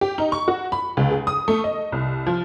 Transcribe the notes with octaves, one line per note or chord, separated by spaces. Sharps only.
G4
D#4
C#6
F#4
B5
C#2
G#4
D#6
A3
D#5
C2
F3